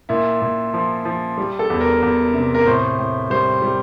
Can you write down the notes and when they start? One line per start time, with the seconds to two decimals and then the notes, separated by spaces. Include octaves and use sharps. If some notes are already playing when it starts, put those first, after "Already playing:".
0.09 A#2 E4
0.42 A#2
0.74 F3
1.05 F3
1.38 G3
1.59 A4
1.70 E2
1.81 A#4
2.02 E2
2.34 C3
2.55 A#4
2.66 A2 C5
2.98 A2
3.30 G3 C5
3.62 G3